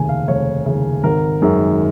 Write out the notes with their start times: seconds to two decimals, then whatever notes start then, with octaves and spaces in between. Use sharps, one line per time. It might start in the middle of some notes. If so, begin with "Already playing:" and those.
Already playing: F1 D#2 C#3 G#5
0.09 F5
0.28 F1 C#5
0.66 D#2 C#3
1.04 G#1 A#4
1.42 F#2 D#3 G#3